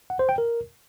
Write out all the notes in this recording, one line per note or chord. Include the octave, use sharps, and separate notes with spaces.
F#5
C5
G5
A#4